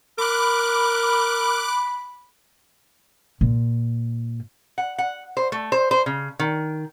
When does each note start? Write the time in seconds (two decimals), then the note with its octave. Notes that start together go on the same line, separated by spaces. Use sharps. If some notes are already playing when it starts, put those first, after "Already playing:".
0.18 A#4 B5 D6 F#6
3.41 A#2
4.78 F#5
4.98 F#5
5.37 C5
5.52 A3
5.72 C5
5.91 C5
6.06 C#3
6.39 D#3